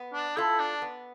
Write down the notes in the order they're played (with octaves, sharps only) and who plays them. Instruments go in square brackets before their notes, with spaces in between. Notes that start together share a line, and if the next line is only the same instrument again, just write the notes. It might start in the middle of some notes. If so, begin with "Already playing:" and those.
Already playing: [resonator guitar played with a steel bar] B3
[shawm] D4
[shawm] E4 [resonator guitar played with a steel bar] F4 A4
[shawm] D4
[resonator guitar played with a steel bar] B3